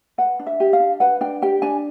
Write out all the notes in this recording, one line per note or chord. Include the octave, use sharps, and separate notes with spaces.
B4 F#5
D4
E5
G4
F5
D4
B4 F#5
D4 G5
G4 G5
D4 G#5